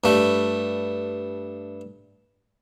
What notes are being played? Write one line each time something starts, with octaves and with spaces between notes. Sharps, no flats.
G2 A3